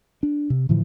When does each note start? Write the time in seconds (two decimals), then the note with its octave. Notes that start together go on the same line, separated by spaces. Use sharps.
0.23 D4
0.50 C3
0.69 A2 D3 E3 F3